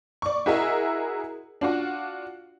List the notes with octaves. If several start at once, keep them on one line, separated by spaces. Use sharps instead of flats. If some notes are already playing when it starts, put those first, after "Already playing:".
D5 C#6
E4 F#4 G#4 A#4 D#5 E5
D4 F4 F#4